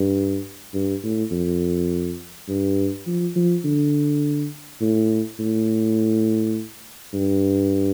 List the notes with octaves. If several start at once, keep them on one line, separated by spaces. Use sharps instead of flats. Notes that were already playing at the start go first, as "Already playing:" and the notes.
Already playing: G2
G2
A2
F2
G2
F3
F3
D3
A2
A2
G2